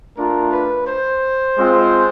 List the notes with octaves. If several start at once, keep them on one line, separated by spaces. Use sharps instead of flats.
A3 D4 F4 A#4
B4
C5
G#3 C4 F4